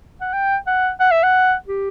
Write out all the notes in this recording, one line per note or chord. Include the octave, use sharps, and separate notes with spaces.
F#5
G5
F#5
F#5
E5
F#5
G4